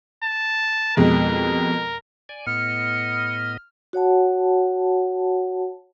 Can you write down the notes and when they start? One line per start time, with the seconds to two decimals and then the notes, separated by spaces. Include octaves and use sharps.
0.24 A5
0.97 F2 B2 G#3 A#4
2.29 D5 G#5
2.46 A2 B3 D#5 F6 C#7
3.93 F#4 C#5 F#5 A5